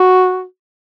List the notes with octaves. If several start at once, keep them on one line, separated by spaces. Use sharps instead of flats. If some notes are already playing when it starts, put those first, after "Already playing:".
Already playing: F#4